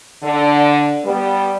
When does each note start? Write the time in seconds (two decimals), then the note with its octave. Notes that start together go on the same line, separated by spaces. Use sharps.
0.22 D3
1.04 G3 B3